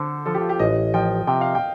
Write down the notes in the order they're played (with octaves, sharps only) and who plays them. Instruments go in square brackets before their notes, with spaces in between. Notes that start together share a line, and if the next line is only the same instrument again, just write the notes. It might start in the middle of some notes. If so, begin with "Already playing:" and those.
Already playing: [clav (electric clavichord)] D3 [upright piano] A4 C5
[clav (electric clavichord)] F3 [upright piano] A4
[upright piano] G4
F4
G4
[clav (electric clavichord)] A1 [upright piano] D#5
[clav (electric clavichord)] F3 [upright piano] G5
[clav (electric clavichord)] C3 [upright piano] G5
[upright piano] F5
G5